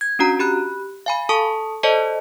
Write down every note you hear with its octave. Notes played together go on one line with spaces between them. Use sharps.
G#6
C#4 D4 F#4 A#5
G4 B5 F#6
F5 G#5 B5
A4 A5 C#6 D#6
A4 C5 D5 D#5 A5